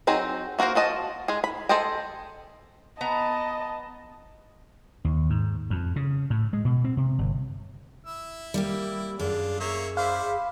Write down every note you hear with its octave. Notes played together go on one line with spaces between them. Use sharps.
F#3 C4 D#4 G#4
A#3 F#4 G#4 A#4 C5
F3 F#4 D#5 A5
G#3 G#4
B5
G#4 A4 C5 D#5 G5
B3 D#5 A5 A#5
D#2
G#2
F2
C#3
A2
G#3
B2
C4
C3
G1
E4 E6
G3 A#3 G4
F#2 D4 F4 G#4
A#3 G#4 C#5 E5
E4 C5 D5 F5 B5